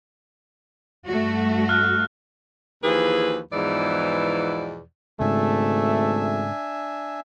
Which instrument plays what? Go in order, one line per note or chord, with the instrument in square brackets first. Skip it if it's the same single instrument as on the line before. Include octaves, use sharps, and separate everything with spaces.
[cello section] G2 A3 F#4
[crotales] F6 F#6
[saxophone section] D#2 E3 F3 G#4 B4
E2 G#2 B2 E3 F3 D5
[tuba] G#1 [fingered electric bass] G#2 C#3 [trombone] A3 [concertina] D4 E5 G#5